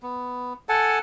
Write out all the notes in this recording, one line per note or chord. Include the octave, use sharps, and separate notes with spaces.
B3
A4 F#5 G#5 A5